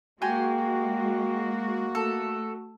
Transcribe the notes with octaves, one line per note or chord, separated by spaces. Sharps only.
G#3 A#3 F#4 G4 G#5 C6
A3 A4